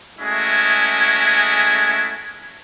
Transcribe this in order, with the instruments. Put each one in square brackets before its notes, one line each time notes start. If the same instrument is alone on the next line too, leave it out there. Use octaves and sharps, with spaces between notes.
[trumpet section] G#3 A3 C#4 E4 F#4 G#4